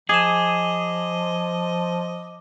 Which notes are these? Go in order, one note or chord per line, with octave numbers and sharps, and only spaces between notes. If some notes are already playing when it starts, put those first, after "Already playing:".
F3 G#4 D#5 D6 E7